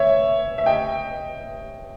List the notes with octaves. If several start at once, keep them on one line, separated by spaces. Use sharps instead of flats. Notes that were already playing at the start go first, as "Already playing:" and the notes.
Already playing: C#5 E5
E5
D#5 G5